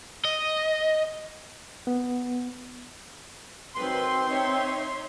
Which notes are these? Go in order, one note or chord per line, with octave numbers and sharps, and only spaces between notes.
D#5
B3
D#3 F#3 C4 B4 C6
D#4 C#5 E5